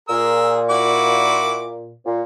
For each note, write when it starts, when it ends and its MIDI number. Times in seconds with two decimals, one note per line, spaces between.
0.09 1.93 46
0.09 0.60 68
0.09 0.60 70
0.09 0.60 88
0.70 1.71 64
0.70 1.71 66
0.70 1.71 86
2.04 2.21 46